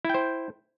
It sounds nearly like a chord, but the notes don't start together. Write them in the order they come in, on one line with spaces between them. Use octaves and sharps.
E4 G5 C5